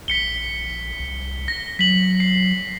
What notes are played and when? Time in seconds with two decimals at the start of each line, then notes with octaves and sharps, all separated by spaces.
0.08 A#1 B6 C#7 G7
0.99 C2
1.48 A#6
1.79 F#3 B6 F#7
2.20 C7